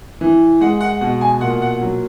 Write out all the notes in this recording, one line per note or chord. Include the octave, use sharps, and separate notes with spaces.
E3
G#3 F#5
F#5
B2 F#5
G#5
A#2 F#5
F#5
F#3